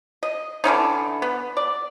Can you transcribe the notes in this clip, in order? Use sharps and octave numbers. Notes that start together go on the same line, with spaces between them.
D#5
D3 E3 C#4 D#4
B3
D5